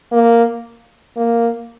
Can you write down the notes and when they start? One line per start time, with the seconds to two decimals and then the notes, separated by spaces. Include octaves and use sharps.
0.12 A#3
1.17 A#3